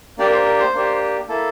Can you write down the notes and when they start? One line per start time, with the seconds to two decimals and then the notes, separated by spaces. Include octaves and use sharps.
0.18 A#3 D4 G4 D5
0.26 A#4
0.32 C5
0.45 A#4
0.59 C5
0.73 A#3 D4 G4
1.28 A#3 E4 A4